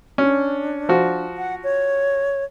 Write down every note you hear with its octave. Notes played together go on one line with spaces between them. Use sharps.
C#4 D4
F3 F#4
F#5
C#5